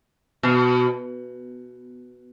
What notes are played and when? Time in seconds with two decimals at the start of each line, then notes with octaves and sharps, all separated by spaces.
0.43 B2